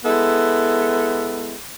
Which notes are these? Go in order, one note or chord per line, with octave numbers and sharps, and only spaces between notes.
G#3 B3 E4 A4